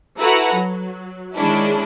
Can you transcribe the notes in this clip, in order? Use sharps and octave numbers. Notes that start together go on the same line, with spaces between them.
E4 F#4 A4 B4 F#5 A#5
F#3
D#3 G#3 C#4 D4 E4